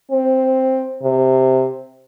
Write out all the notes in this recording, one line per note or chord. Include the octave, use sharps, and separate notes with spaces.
C4
C3